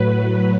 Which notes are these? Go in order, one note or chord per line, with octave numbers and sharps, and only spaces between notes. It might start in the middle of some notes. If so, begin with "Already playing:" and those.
Already playing: A2 F#3 B4